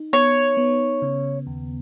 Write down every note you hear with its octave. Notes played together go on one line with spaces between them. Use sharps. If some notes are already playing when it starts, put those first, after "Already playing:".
Already playing: D#4
B3 C#5
B3
C#3
D#2